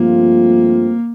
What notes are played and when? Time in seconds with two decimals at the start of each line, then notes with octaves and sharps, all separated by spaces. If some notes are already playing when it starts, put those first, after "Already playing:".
Already playing: G2 F3 A3 A#3 C4 F4